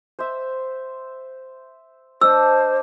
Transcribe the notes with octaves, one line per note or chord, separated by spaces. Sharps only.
C5 E5
D4 C5 D#5 A5 E6